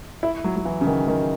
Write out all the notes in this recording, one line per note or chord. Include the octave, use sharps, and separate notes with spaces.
E4
F#3
F#3
E3
C#3
D#3
D#3